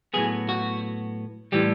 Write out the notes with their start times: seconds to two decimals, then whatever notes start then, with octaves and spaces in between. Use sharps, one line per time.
0.14 A2 F#3 B3 G#4
0.49 F#4
1.52 A2 E3 G3 G4